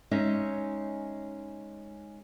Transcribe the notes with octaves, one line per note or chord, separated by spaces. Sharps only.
G#3 C#4 D#4 E5